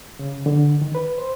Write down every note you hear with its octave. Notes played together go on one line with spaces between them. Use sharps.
C#3
D3
D#3
B4
C5